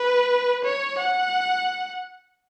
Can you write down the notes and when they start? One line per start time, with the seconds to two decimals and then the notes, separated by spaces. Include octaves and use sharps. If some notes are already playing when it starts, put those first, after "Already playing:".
Already playing: B4
0.64 C#5
0.98 F#5